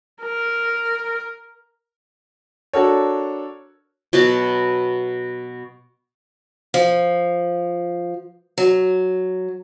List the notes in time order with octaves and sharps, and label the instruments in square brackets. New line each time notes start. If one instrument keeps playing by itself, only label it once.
[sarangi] A#4
[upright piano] D4 F#4 A4 A#4 C#5
[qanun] B2 F#3 F#4 A5
[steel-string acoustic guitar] F3
F#3